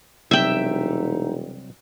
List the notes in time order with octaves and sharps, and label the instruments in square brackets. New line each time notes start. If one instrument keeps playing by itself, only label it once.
[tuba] E1 [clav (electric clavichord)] C3 F#3 G3 [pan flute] D#4 [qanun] E5 G5